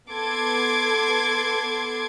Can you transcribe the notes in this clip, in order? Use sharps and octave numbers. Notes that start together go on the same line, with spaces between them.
B3 A4 C6 D6 G#6